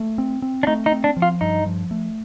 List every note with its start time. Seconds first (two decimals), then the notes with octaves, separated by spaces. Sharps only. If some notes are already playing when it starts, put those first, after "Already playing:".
Already playing: A3
0.18 C4
0.42 C4
0.63 D4
0.67 A3 D#4
0.86 D#4
0.92 C4
1.04 D4
1.17 F3
1.22 F4
1.41 G2 D#4
1.66 F3
1.91 A3